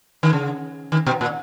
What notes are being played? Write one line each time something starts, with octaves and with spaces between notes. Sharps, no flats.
D#3
C#3
D#3
B2
A#2